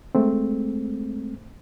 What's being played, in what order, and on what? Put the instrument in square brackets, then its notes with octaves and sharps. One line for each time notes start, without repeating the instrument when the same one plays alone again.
[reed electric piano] G#3 A3 C4